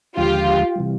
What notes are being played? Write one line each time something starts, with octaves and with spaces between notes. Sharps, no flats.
D#2 D3 F3 G#3 F4 G4
C3 E3 G3